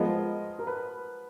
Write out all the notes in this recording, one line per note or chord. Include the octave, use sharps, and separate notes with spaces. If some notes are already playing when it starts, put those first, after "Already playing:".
Already playing: F3 G#3 B3 F4 A#4 D#5
A#4
B4